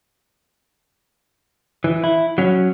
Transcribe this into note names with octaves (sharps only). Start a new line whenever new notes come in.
E3
E4
F#3 C#4